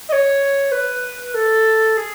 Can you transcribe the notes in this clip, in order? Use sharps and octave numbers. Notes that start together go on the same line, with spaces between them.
D#5
C#5
B4
A4
G#4